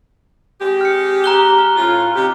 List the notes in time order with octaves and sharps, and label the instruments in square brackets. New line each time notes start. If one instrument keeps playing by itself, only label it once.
[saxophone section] G#3 C4 G4
[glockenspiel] F6 C#7
A#5 F#6 G7
F6
[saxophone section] A2 C#4 F4
C3 D#4 G4